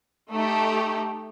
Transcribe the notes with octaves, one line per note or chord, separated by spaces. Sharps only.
A3 D#4 G4